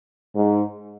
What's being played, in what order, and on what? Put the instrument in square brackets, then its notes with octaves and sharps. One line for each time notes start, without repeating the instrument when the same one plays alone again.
[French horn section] G#2